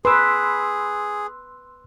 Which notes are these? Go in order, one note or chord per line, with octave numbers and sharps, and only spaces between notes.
G#4 B4 C6 E6